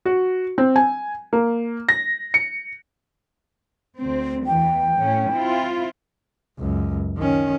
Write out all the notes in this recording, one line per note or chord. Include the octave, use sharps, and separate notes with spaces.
F#4
C4
G#5
A#3
A#6
C#7
D2 C4
E2 E3 G5
A2 C#4
C4 E4 F4
C#2 F#2
D#3 C#4